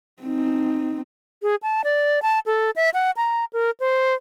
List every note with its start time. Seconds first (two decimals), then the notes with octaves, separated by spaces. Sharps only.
0.23 C4 D#4
1.43 G#4
1.63 A5
1.84 D5
2.22 A5
2.46 A4
2.76 E5
2.94 F#5
3.17 A#5
3.53 A#4
3.80 C5